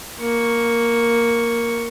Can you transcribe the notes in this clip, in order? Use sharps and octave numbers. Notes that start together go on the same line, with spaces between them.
A#3 C#6